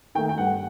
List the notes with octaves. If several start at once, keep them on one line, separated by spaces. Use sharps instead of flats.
D#3 A3 G5
G5
G2 F#5